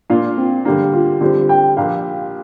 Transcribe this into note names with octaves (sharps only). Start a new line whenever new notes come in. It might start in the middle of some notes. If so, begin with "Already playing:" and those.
A#2 A#3 D4 F4
C4
D3 G3 A#3 D4
F4
D3 G3 C4 F4 G4
G5
A#1 A#2 A#3 D4 G4 F5